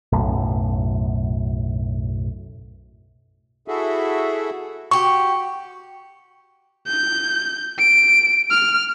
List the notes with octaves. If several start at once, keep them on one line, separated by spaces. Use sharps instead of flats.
B1 F#2 A2
E4 F#4 G#4 A4 E5
F#4 G4 C#6
G6
D7
F6